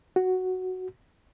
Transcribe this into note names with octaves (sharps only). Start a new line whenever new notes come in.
F#4